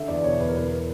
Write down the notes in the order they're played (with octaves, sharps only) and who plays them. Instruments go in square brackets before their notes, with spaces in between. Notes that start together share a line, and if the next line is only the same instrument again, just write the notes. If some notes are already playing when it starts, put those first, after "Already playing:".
Already playing: [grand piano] D3 E5
E2 D5
B2 C#5
E2 B4
A#4
B2 B4
A#4